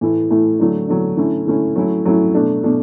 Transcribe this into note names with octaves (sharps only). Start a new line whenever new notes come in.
A2 E3 A3 E4
A2 E3 A3 E4
D3 F#3 A3 D4
D3 F#3 A3 D4
D3 A3 C#4 E4
D3 A3 C#4 E4
F#3 A3 C#4 E4
F#3 A3 C#4 E4
B2 A3 D4
B2 A3 D4